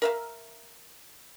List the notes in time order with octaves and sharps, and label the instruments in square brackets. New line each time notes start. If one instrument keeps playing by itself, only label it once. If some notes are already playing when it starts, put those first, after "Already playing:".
[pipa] A#4 E5 F5